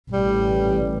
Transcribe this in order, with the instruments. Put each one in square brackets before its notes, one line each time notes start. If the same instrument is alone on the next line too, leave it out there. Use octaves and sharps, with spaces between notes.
[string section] A1 [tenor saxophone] G3